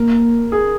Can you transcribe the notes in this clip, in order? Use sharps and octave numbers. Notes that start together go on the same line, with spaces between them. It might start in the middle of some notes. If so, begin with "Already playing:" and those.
Already playing: A#3 A#4
G#4